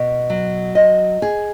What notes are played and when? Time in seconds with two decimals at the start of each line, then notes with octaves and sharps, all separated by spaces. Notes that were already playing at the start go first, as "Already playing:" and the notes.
Already playing: B2
0.30 F#3
0.75 D#5
1.22 G#4